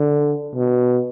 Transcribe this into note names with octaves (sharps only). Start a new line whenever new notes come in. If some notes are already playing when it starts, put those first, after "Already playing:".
Already playing: D3
B2